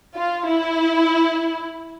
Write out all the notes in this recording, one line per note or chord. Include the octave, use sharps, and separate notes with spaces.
F4
E4